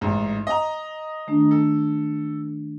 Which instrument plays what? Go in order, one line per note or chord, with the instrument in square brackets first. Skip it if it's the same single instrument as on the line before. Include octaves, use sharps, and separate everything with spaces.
[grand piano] A1 G#2
D#5 A#5
[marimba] D#3 A3 D4
[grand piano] A4